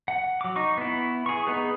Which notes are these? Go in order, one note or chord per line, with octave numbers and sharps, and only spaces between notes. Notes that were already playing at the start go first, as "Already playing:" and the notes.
F#5
F#3 D6
D#4 C#6
B3 E4
G#4 C#6
B3 D#4 G#4 B4